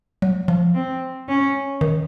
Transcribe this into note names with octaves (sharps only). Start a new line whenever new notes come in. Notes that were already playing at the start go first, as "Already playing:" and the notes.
F#3
F3
C4
C#4
D#3